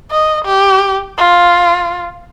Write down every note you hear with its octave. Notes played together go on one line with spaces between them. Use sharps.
D#5
G4
F4